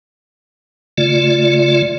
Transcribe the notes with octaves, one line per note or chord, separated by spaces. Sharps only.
C#3 A3 F4 D5